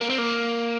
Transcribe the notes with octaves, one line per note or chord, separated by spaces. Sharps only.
A#3
C4
A#3